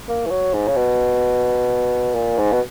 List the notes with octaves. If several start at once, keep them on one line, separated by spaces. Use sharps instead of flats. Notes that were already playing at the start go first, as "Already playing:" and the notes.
A#3
E3
F#3
G#2
C#3
B2
A#2
G#2
B2